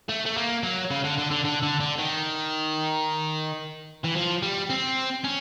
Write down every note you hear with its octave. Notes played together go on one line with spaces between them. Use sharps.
A3
A3
A#3
F#3
C#3
D3
D3
D3
D3
D3
D3
D#3
E3
F3
G3
C4
C#4